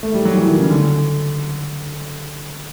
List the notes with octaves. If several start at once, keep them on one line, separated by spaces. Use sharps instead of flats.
A3
G3
F#3
E3
D#3
C#3
D3